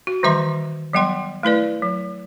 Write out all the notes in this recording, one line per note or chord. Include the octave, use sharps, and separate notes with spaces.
F#4
D#3 E3 G3 E5 A#5 C6
F#3 G3 B3 G5 C6
A3 E4 B4 D5
F#3